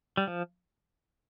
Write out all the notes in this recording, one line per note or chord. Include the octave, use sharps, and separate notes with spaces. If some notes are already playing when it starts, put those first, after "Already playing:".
G3
F3